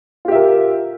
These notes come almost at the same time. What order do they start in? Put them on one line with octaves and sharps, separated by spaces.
F4 G4 E5 A#4